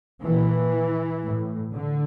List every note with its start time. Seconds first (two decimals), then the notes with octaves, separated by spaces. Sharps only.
0.22 A#2 E3
1.23 A2
1.74 D3